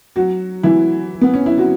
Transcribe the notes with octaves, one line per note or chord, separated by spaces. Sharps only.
F#3 F#4
E3 E4
B3
C#4
E4
F#3 F#4